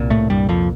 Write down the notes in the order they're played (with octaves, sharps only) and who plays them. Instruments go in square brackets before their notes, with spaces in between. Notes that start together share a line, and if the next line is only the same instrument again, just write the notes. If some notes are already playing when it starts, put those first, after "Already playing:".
Already playing: [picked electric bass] C2 A#2
A2 A3
G2 G3
F2 F3